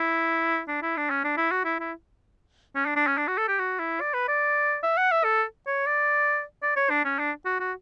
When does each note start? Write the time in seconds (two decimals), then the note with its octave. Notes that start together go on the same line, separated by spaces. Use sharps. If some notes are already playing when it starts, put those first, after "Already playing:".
Already playing: E4
0.68 D4
0.82 E4
0.97 D4
1.10 C#4
1.24 D4
1.38 E4
1.52 F#4
1.65 E4
1.80 E4
2.76 C#4
2.86 D4
2.96 D4
3.07 C#4
3.18 D4
3.28 F#4
3.38 A4
3.48 G4
3.59 F#4
3.80 E4
4.01 D5
4.14 B4
4.28 D5
4.83 E5
4.98 F#5
5.12 E5
5.24 A4
5.67 C#5
5.86 D5
6.63 D5
6.76 C#5
6.90 D4
7.05 C#4
7.19 D4
7.46 F#4
7.60 F#4